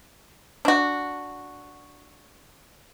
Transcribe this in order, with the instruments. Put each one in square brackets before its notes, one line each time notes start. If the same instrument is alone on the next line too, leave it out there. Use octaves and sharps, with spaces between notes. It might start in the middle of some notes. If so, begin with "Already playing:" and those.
[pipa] D4 F#4